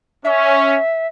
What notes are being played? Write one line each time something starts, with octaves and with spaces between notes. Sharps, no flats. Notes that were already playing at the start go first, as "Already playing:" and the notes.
C#4 E5